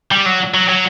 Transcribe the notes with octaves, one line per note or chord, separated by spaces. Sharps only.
G3
F#3
F#3
F#3